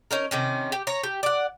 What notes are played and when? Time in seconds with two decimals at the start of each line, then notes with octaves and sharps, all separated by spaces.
0.11 C#4 D#4 A#4
0.31 C3 D#3 C#4
0.72 G4
0.87 C#5 A#5
1.03 G4
1.23 D5 F#5